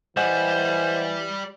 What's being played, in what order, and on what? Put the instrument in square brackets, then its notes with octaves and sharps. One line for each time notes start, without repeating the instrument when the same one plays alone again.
[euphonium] E3 [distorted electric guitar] G3 [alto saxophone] C5 [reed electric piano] D#5 F#5 G#5